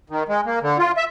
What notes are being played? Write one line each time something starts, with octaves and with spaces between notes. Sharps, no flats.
D#3
G#3
A#3
D3
F4
E5